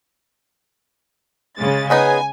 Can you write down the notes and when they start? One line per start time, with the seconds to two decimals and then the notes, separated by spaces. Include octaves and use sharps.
1.57 C#3 G#3 A6
1.90 G#3 B3 D#4 G#4 B4 C#5 G#5